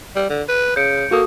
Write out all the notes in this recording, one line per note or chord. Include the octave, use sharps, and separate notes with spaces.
G3
D3
B4
C#3 G6 C#7 D7
A#3 F#4 A4 D#6